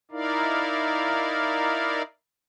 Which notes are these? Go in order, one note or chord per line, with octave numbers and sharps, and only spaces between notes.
D#4 E4 A#4 D5 F5